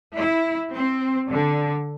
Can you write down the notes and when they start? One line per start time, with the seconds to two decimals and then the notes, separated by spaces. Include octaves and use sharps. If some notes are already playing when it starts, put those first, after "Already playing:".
0.17 E4
0.74 C4
1.28 D3